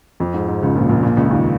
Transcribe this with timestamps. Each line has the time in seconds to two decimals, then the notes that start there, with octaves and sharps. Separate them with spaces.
0.20 F2
0.34 G#2
0.48 G#2
0.62 C#2 C#3
0.75 A#1 A#2
0.89 A#1 A#2
1.03 A#1 A#2
1.17 C#2 C#3
1.31 D#2 D#3